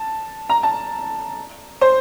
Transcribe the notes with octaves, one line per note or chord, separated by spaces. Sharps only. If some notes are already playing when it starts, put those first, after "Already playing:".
Already playing: A5
A#5
A5
C5